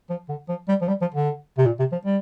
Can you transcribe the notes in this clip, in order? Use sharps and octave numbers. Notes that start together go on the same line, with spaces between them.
F3
D3
F3
G3
F3
G3
F3
D3
C3
A#2
C3
F3
G3